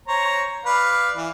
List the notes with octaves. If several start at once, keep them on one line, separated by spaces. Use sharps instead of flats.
C5 C#5 A#5
B4 D5 F5
E3